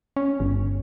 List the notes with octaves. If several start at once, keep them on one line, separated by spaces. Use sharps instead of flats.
C#4
G1